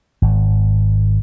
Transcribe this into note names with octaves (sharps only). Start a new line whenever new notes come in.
G#1